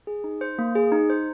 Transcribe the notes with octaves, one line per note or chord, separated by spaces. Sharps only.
G#4
D#4
C5
A#3
G#4
D#4
C5